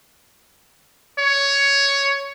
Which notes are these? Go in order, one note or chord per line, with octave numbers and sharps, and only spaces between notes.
C#5